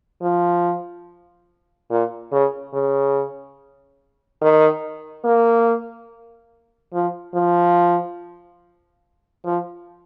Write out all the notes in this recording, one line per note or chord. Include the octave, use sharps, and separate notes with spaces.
F3
A#2
C#3
C#3
D#3
A#3
F3
F3
F3